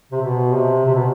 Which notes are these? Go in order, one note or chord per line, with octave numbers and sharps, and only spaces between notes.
C3
B2
C3
C3
B2